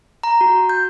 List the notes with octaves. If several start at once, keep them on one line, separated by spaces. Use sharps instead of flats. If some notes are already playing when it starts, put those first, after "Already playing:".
A#5
F#4
G6